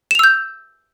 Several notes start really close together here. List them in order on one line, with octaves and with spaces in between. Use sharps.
E7 F7 E6 G6